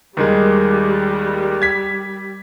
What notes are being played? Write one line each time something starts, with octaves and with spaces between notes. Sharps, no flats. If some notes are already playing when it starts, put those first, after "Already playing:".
D#2 D#3 G3 G#3
G#6 B6